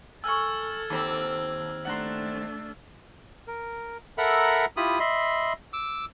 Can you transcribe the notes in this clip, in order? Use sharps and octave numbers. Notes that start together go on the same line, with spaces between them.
A4 G#5 C#6 E6 F6 G#6
D#2 C4 D5 B5
A3 D4 F#5 A#5 C6
A#4
A4 A#4 E5 F#5 A#5 B5
E4 F4 G4 B5 D#6
D#5 E5 B5 C6
D6 E6